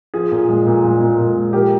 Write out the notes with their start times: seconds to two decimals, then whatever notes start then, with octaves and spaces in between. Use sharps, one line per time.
0.14 F3 G#4
0.31 A#2
0.49 G#3
0.66 A#2
0.84 G#3
1.01 A#2
1.19 A#2
1.37 G#3
1.53 F3 G4 A#4